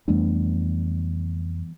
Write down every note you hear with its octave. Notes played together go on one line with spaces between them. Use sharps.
F2 E3 G3 A3 B3 D4